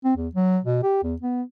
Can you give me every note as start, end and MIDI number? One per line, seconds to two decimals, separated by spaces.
0.04 0.14 60
0.16 0.28 40
0.35 0.58 54
0.64 0.80 47
0.83 1.00 67
1.03 1.15 40
1.22 1.43 59